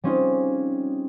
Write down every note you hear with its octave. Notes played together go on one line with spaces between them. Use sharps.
G3 C4 C#4 D#4 F4 G#4